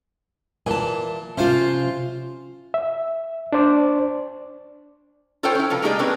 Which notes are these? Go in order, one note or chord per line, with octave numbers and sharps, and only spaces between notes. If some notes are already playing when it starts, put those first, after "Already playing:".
A#2 E3 G#5 A5
C3 C#4 F4 C5 F5
E5
D4 C5 D5
F4 A4 A#4 C5 C#5 G5
C#4 E4
C3 F3 F4 B4
G#3 A#3 D#4 G4 G#4 D5
C4 D4 A#4 B4 C#5